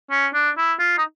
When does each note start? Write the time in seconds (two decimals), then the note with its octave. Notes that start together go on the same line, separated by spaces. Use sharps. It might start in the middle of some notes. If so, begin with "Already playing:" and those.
0.11 C#4
0.34 D4
0.57 E4
0.79 F4
0.98 D#4